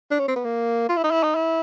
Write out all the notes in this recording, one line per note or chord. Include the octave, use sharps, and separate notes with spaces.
D4
C#4
C4
B3
A#3
F4
E4
D#4
E4
D#4
E4